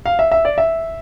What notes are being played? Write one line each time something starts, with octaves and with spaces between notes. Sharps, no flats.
F5
E5
E5
D5
E5